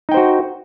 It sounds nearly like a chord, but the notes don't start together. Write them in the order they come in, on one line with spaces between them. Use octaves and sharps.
D#4 G5 C5 F#4